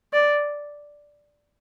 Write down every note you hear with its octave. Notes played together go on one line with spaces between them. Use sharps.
D5